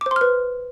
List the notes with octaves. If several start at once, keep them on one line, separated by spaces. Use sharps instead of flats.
D6
C5
C6
F6
B4